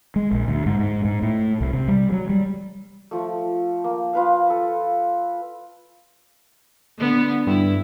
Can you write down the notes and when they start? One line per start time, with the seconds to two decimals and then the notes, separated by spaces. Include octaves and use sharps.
0.16 G#3
0.32 A#1
0.48 D2
0.66 G#2
0.79 G#2
1.05 G#2
1.23 A2
1.61 C2
1.73 C3
1.88 G3
2.12 F#3
2.29 G3
3.11 F3 A3
3.84 A#3
4.13 F4 B4 F5
4.50 A4
6.99 D3 B3
7.47 G2 E4